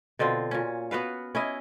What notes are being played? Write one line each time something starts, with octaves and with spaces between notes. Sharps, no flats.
B2 D3 C4 F4
A#2 C#4
B3 F#4 B4 F5
C#4 E4 D#5